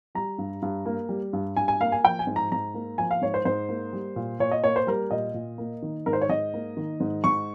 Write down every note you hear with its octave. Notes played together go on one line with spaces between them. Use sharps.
G3 A#5
G2
G2
A#3
G3
G2
G2 G#5
G#5
A#3 F5
G#5
F3 G5
G#5
G#2
A#5
G#2 A#5
A#3
F3 G#5
F5
G#2 C#5
C5
G#2 C5
A#3
G3
A#2
A#2 C#5
D#5
A#3 C#5
C5
G3 A#4
A#2 D#5
A#2
A#3
D#3
G#2 A#4
C5
C#5
G#2 D#5
A#3
D#3
G#2
G#2 C#6